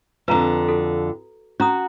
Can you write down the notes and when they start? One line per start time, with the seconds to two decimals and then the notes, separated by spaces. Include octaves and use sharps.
0.28 F2 D3 B4 A#5
0.68 F#4 A4
1.60 C#4 F#4 A#5 D#6